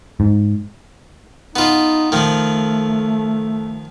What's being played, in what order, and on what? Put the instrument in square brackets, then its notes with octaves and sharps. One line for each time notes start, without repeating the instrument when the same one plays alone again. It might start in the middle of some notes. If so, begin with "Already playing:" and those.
[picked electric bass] G#2
[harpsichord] B3 F4 [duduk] D#4
[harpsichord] D#3 F3 [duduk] A3